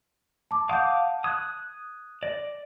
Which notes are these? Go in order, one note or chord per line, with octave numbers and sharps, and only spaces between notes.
A5 D6
F5 F#5 A5 D6 D#6 G6
D#6 F#6 G#6
D5 A#6